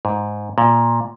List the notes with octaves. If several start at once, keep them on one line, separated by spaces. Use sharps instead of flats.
G#2
A#2